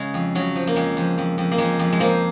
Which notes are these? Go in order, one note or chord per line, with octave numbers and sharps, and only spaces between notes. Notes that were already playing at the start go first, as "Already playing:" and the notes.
Already playing: C#3 G#3
F2
C#3 F#3
F3
A#3
F2 G#3
F2
F2
F2
A#3
F2 G#3
F2
G#3
F3 A#3